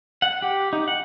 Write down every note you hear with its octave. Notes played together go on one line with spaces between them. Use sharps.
F#5
G4
D#4
F#5